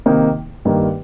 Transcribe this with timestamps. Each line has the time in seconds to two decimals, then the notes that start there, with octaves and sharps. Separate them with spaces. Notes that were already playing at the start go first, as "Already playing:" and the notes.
0.06 C3 D#3 A#3 D#4
0.65 G2 D#3 G3 A#3